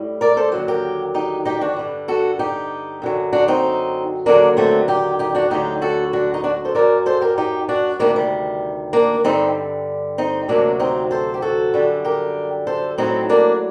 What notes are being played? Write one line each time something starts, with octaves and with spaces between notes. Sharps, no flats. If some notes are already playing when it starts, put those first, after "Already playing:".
Already playing: A2 G3
A#4 D5
A4 C5
D#2 D3 F#3
G4 A#4
D#4 G4
D#4 G4
D4 F#4
G2 D3 G3
F#4 A4
D#4 G4
F#2 D3 F#3
D4 F#4
C4 D#4
D#2 D3 F#3 A#3 D4
A3 C4
D#4 G4
D#4 G4
D4 F#4
D2 D3 F#3 D#4 G4
F#4 A4
D4 F#4
D#4
D4 F#4
A4 C5
F#2 F#3 A#4 D5
A4 C5
G4 A#4
D#4 G4
D4 F#4
D2 C3 D#3 G3 A#3 D4
G3
A#3 D4
G2 D3 G3 C4 D#4
C4 D#4
D2 C3 F#3 A#3 D4
C4 D#4
A4 C5
G4
F#4 A4
F#2 D3 G3
G4 A#4
A4 C5
A2 F#3 C4 D#4
A#3 D4